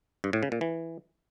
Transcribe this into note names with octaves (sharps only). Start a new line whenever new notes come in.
G2
A2
C#3
A#2
E3